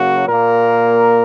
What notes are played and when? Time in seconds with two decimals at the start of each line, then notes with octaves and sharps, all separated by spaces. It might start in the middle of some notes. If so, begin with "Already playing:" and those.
Already playing: C#3 F#3 A#3 F#4
0.28 A#2 A#3 A#4